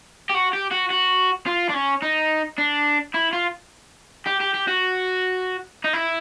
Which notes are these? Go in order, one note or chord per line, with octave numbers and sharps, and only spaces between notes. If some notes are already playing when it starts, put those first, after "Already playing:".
G4
F#4
G4
F#4
F#4
F4
D4
C#4
D#4
D4
E4
F4
G4
G4
G4
F#4
D#4
E4